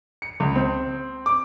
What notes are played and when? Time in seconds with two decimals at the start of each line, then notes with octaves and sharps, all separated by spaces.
0.22 C#7
0.40 C#2
0.55 C4
1.26 D6